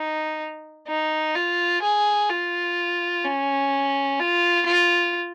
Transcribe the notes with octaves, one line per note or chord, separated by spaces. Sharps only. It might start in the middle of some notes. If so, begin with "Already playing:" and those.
Already playing: D#4
D#4
F4
G#4
F4
C#4
F4
F4